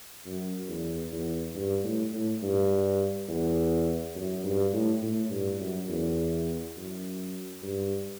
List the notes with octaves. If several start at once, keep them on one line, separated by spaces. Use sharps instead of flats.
F#2
E2
E2
G2
A2
A2
G2
E2
F#2
G2
A2
A2
G2
F#2
E2
F#2
G2